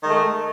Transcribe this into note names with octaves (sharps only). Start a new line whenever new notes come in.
D#3 G#3 A3